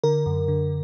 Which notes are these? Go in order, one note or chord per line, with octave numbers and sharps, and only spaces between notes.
D3 A#4
F#2
D3